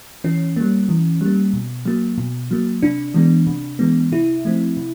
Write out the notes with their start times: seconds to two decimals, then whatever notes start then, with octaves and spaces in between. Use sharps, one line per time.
0.24 E3 C#4
0.56 G3 A#3
0.89 E3
1.21 G3 A#3
1.54 B2
1.86 F#3 A#3
2.18 B2
2.51 F#3 A#3
2.83 C3 D4
3.14 E3 G#3 B3
3.47 C3
3.79 E3 G#3 B3
4.12 C3 E4
4.45 F3 A3 C4
4.77 C3